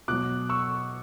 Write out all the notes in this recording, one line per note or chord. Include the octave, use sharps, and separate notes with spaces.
B2 F#3 D6 F#6
C#6 E6